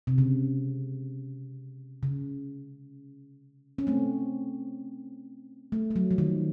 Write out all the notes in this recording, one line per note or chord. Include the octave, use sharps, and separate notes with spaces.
C3
C#3
C#3
C#4
A3 C4
A3
A3
F#3
F3
D#3